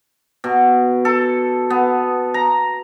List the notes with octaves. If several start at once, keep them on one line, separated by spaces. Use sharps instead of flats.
B2
A4
B3
A#5